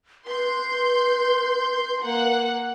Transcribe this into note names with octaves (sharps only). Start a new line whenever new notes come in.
B4 C6 G6
A#3 F#5